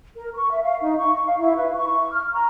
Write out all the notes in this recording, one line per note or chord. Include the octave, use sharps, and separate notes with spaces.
A#4
C#6
E5
F5
D#4
C#6
F5
E4
B4
C#6
F6
A#5